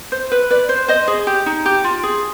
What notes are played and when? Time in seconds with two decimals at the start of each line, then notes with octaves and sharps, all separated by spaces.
0.12 C5
0.32 B4
0.50 B4 D5
0.69 C5
0.88 C5 D#5
1.08 G#4
1.27 G4
1.46 D#4
1.66 G4
1.84 F4
2.03 G#4